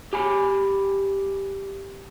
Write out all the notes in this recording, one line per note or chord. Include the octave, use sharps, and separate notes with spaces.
G4 G#5 B5